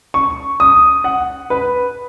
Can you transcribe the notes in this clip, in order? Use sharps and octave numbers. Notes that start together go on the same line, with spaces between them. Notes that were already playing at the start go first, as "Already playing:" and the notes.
C#6
D#6
F#5
B4